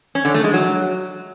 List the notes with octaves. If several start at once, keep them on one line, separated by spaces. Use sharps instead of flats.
C#4
D3
A3
G#3
F#3